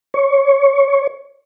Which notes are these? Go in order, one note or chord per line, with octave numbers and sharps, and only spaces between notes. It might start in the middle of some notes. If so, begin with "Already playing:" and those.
C#5